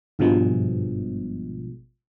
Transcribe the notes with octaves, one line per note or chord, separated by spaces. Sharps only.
G#1 G2 B2 F3 G#3